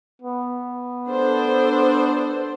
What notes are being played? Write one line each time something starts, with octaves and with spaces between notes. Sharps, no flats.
B3
D4 A4 C5